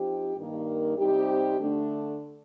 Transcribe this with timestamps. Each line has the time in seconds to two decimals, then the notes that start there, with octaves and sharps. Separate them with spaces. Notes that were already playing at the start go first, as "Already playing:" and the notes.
Already playing: F3 C4 D#4 G4
0.35 G2 D#3 A#3
0.97 C3 G3 C4 D#4 G4
1.59 D3 A3 D4